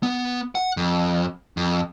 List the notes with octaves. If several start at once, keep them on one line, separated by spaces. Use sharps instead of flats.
B3
F#5
F2
F2